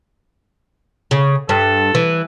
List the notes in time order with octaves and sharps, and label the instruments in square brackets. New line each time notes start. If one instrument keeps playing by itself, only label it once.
[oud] C#3
[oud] G2 [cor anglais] A4
[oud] E3